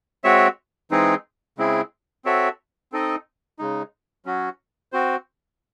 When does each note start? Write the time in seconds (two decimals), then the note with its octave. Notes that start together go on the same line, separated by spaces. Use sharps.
0.24 G#3 C4 F#4 C#5 E5
0.91 E3 G#3 C4 D#4 G#4
1.58 C#3 G#3 C4 E4 G#4
2.25 C4 F#4 A4 C#5 E5
2.92 C4 D#4 A4 D#5
3.59 C#3 G#3 D#4
4.25 F#3 C#4 F#4
4.92 C4 F#4 C5